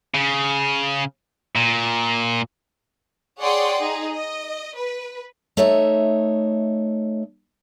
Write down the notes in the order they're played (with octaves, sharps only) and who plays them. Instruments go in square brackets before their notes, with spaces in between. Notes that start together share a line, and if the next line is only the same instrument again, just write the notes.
[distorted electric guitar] C#3
A#2
[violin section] G#4 C#5 D5 F#5 G5 C6
D#4 G#4
D#5
B4
[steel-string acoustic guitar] A3 D#4 C#5 D#5 E5